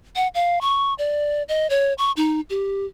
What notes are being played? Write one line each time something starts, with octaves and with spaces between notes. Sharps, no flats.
F#5
F5
C#6
D5
D#5
C#5
C#6
D#4
G4